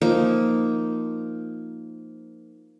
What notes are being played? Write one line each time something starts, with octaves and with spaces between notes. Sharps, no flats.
F3 A#3 D#4